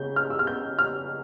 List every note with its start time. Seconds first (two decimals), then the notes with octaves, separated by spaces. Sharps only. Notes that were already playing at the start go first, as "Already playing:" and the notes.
Already playing: C#3 G6
0.16 F6
0.30 E6
0.39 F6
0.47 G6
0.79 F6